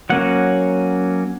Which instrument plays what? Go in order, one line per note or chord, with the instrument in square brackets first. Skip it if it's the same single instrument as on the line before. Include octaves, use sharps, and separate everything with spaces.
[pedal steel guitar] F#3 A#3 C#4 F#5